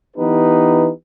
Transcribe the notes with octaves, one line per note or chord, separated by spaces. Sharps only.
E3 B3 D#4 G4 B4